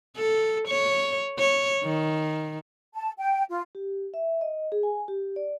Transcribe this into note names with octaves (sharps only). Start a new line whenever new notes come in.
A4
C#5
C#5
D#3
A5
G5
F4
G4
E5
D#5
G#4
G#5
G4
D5